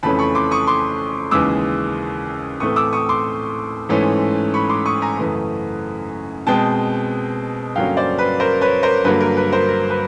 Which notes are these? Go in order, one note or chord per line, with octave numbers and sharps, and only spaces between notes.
F2 C#3 E3 A3 C#4 A5 B5
B5 C#6
C6 D6
C#6 D#6
C6 D6
D#2 C#3 E3 G#3 D6 E6
A2 E3 A3 C4 C#6 D#6
D6 E6
C#6 D#6
C6 D6
G#2 E3 A3 C#4
B5 C#6
C6 D6
C#6 D#6
G#5 A#5
F#2 C#3 E3 A3
B2 G#3 C4 G5 A5
G2 D3 F#3 A#3 C#4 F5 G5
C5 D5
B4
A#4 C5
B4 C#5
A#4 C5
G2 D3 F#3 A#3 B4
A#4
B4
A#4 C5
A#4
B4